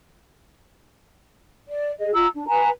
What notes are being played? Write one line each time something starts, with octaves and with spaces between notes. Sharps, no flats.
D5
G#4 D#5
F4 A#5 E6
D4
B4 G#5 A#5